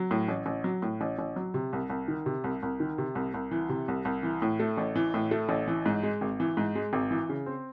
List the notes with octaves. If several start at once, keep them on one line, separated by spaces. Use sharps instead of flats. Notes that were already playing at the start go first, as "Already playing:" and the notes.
Already playing: F#3
A2
A1
A1
F#3
A2
A1
A1
F#3
C3
C2
C2
D#3
C3
C2
C2
D#3
C3
C2
C2
E3
C3
C2
C2
E3
A2
A3
A1
E3
A2
A3
A1
E3
G#2
G#3
G#1
E3
G#2
G#3
G#1
E3
C#3
C4